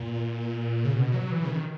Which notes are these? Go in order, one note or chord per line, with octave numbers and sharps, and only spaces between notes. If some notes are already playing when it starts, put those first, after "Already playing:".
Already playing: A#2
C#3
B2
F#3
E3
C#3
D#3